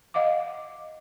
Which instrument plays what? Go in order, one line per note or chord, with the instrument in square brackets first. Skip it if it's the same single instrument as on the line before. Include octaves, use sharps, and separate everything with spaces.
[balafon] D#5 F5 F#5 D6